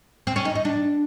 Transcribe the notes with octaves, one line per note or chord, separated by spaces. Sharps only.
C4
C#4
D#4
D#4
D4